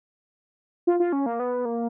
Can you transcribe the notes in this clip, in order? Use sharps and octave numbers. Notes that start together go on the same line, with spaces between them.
F4
F4
C#4
A#3
B3
A#3